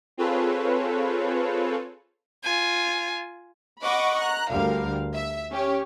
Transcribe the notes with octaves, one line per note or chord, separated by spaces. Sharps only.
C4 F4 G#4 A4 B4 C#5
F4 G#5
D#5 F#5 B5 C#6 D6
A#5 F#6
D2 D3 G3 A#4 F5
E5
C#4 G4 C#5